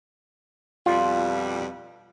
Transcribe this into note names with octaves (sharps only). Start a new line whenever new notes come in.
F2 B2 G3 F4